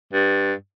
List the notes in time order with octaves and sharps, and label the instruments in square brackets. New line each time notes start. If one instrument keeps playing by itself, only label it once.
[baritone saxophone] G2